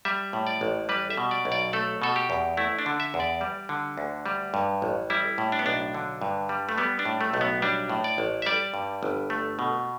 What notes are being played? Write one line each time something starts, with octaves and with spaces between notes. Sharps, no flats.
G3 E5
A2
D5
A1
G3 B4
E5
B2
D5
B1
D5
A3 A4
B2 A4
G4
E2
A3 E4
D4
D3
E5
E2
D5
G3
D3
D2
G3
G2
A1
G3 E4
A2
D4
B3
B1 D4
D3
G2
G3
A3
G3 B3
D4
A2
A3
B1 A3
B3
G3 D4
A2
D5
A1
E5
G3 D5
G2
G1
A3
B2